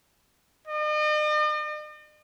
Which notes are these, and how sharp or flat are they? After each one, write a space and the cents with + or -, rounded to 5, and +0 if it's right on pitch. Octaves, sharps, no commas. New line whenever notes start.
D#5 -45